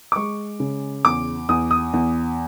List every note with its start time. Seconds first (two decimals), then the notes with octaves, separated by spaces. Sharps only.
0.12 D6
0.16 G#3 C#6
0.60 C#3
1.05 E2 D6
1.49 E2 D#6
1.71 D#6
1.93 E2